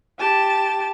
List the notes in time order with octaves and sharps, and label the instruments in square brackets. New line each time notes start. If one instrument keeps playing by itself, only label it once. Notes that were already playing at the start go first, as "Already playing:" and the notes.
[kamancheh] G4 A5